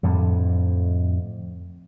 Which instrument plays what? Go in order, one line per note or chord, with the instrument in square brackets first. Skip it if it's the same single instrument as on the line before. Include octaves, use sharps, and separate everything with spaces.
[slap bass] F2 A2 D3